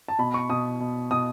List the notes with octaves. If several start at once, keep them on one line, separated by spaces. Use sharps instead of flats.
A5
B2 B5
C#6
B2 D#6
B2
B2 D#6